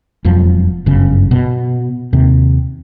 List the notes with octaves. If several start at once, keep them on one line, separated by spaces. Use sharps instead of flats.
E1 F2 F3 F#3
G1 F#2 C#3
B2
D#2 C3